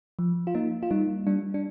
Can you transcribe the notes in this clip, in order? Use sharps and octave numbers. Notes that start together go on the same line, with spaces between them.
F3
F4
A#3 D#4
F4
G3 D#4
G3 D4
D4